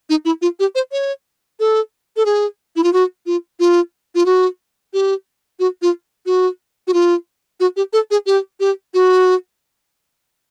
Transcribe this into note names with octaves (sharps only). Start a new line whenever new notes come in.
D#4
E4
F4
G4
C5
C#5
A4
A4
G#4
E4
F4
F#4
F4
F4
F4
F#4
G4
F#4
F4
F#4
F#4
F4
F#4
G4
A4
G#4
G4
G4
F#4